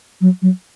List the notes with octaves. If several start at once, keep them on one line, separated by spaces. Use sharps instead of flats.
F#3
F#3